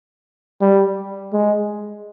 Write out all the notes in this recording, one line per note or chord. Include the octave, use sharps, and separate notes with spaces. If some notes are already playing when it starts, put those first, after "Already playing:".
G3
G#3